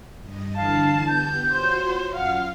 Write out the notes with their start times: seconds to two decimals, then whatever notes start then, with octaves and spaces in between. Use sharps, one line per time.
0.21 G2 D#5
0.56 D3 E3 D4 F5 A5
1.08 B3 G4 G6
1.52 F4 F#4 C5 C#5
2.15 F#2 F4 F5 F#5